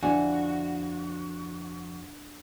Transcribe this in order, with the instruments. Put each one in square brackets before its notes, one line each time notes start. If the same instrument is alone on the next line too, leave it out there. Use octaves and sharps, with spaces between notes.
[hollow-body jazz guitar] F2 [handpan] D4 E4 [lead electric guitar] F#4 [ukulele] D5 F#5 G#5